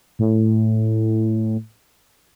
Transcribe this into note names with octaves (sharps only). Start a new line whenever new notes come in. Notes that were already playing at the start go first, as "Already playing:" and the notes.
A2